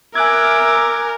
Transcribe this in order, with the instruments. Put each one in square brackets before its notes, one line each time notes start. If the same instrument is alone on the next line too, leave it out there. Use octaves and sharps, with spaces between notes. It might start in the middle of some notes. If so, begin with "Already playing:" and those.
[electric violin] A#4 [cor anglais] E5 [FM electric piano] G#5 F#6 G#6 [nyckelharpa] D6